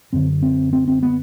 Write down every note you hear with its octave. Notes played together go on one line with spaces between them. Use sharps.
F#2 D3 C4
C4
C4
C4
B3